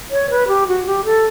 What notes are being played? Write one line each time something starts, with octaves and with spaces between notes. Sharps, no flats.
C#5
B4
G4
F#4
G4
A4